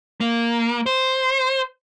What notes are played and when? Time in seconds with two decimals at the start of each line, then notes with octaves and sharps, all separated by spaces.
0.20 A#3
0.86 C5